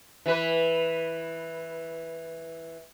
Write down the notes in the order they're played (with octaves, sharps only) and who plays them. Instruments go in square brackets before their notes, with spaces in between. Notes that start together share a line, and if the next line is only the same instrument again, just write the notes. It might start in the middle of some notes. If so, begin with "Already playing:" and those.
[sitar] E3 B4